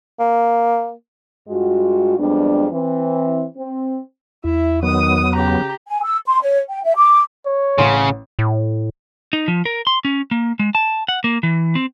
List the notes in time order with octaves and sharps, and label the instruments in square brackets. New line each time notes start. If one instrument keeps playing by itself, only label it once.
[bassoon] A#3
[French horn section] G2 G#3 F4 F#4
F2 G3 G#3 B3 D4
E3 C4
C4
[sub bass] E2 [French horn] E4 [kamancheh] E5
[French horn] D#3 [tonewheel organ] F#3 B3 [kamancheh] D#6
[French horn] C#3 [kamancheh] G4 A#5
[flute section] G#5
E6
C6
C#5
G5
E5
D6
[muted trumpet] C#5
[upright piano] A1 C6 [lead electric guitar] C#3
[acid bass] A2
[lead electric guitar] D#4
F3
A#4
C6
C#4
A#3
G#3
A5
F#5
A#3
E3
C4